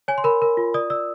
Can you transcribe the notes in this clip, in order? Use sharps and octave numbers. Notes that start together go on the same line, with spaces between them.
C#5 G#5
C6
A#4 B5
A#4
F4
D5 D#6
D5 E6